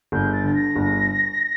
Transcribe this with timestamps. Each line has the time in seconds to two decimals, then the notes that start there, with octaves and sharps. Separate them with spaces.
0.12 G1 G6
0.33 A6
0.44 D3
0.50 A6
0.55 A#6
0.76 G1